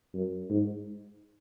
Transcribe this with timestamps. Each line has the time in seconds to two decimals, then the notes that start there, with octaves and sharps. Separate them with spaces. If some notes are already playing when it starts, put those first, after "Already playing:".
0.14 F#2
0.50 G#2